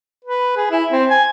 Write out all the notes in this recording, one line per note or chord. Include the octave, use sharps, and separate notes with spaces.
B4
G#4
E4
C4
G#5